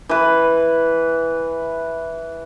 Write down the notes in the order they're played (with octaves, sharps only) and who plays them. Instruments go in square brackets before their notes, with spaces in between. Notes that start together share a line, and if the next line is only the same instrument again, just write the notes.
[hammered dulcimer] E3 B4